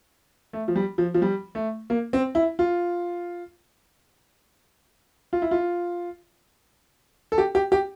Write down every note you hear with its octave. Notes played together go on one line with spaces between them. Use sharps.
A3
F3
G3
F3
F3
G3
A3
A#3
C4
E4
F4
F4
E4
F4
A4
G4
G4
G4